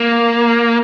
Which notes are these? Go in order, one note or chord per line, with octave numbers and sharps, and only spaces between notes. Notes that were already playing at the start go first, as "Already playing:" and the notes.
Already playing: A#3